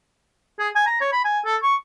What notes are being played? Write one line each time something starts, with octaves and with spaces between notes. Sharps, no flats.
G#4
G#5
A#5
C#5
B5
G#5
A4
C#6